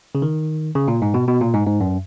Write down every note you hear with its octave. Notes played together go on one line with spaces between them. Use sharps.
C#3
D#3
C#3
A#2
G#2
B2
B2
A#2
G#2
G#2
F#2